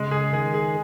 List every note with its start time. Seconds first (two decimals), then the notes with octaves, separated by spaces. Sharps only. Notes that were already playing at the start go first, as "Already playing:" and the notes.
Already playing: C#3 G#3
0.11 G#4
0.33 D#3 G#4
0.54 G#4